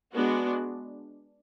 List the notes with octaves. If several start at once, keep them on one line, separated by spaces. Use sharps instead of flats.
G#3 B3 D4 F#4